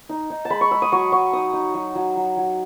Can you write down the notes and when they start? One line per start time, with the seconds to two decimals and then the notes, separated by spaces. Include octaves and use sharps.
0.09 D#4
0.30 D#4
0.45 A5
0.50 G#3 B5
0.61 C#6
0.71 G#3 E6
0.82 D#6
0.92 F#3 C#6
1.12 F#3 C#6
1.33 D#4 D#6
1.53 D#4
1.74 F#3
1.95 F#3
2.16 F#3
2.37 F#3